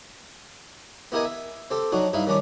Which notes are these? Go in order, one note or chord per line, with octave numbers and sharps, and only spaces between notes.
B3 E4 G4 A#4 D#5 G#5
E5
C4 G4 A4
F#3 D4 D#4 F#4
G2 D#4 E4 E5 F5
D#3 G3 C#4 D4 D5